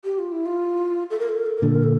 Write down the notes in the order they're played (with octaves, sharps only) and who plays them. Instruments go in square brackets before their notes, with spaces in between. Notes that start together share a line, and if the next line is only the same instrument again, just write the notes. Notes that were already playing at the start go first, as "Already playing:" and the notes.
[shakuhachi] G4
F4
E4
F4
A4
A#4
A4
A#4
A4
A#4
[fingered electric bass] A#2 D3 [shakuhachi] A4
[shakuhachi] A#4
A4